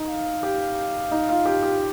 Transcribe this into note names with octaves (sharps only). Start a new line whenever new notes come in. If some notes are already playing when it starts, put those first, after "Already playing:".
Already playing: D#4
F5
G4
D#4
F4
G4
G4